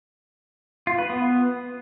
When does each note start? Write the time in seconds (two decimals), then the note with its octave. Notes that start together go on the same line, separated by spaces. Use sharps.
0.87 F4
0.98 B4
1.10 B3